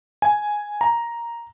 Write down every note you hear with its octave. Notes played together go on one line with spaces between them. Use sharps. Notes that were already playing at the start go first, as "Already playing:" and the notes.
G#5
A#5